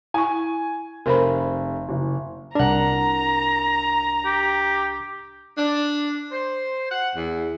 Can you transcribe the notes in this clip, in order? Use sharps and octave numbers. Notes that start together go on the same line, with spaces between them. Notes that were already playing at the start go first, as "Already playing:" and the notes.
E4 G#5 C#6
F1 A#4 C5 B5
F#1
C2 D4 A#4 F#5 A#5
G4
D4
C5
F#5
E2